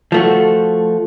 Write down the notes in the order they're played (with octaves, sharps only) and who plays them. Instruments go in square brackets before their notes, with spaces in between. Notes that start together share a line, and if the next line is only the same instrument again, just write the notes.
[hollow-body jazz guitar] F3 A3 F#4